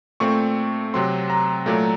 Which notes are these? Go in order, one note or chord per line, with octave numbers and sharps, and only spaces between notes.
A#2 A3 C4 C#6
C3 F#3 C4 C6
A#5
A#2 F#3 A3